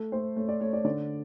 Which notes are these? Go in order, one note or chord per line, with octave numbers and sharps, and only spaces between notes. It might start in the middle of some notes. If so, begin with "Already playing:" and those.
Already playing: A3 A4
A3 C5
A3 C#5
D5
A3 C#5
D5
D3 D5